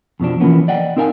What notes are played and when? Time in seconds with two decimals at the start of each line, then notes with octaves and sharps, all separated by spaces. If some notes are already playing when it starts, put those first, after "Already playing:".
0.20 F2 B2 F3 D4
0.40 E3 F3 G3 A#3 B3 C#4
0.68 D5 D#5 F#5 G5
0.97 C4 D#4 A#4 F5 G5 G#5